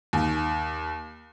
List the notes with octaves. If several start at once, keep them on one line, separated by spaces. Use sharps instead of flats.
D#2